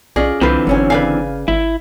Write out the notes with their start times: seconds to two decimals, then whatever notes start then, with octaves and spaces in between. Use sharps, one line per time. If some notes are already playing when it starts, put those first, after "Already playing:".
0.16 B1 C#4 F4 G#4 D5 D#5
0.41 C2 D3 E3 C4 F4 B4 C5
0.67 G1 F#3 C#4 G#5
0.90 C#3 B4 D5 F5 G#5
1.48 G#1 E4